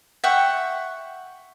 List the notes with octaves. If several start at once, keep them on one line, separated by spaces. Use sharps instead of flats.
E5 F#5 G5 C#6